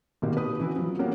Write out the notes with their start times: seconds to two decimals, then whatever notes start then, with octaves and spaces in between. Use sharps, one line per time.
0.22 G#1 B2 A#3 G4
0.37 B4 D#6
0.60 E3 E4 F#4
0.76 F3 F#3
0.99 G3 A#3 B3 C#4 F#4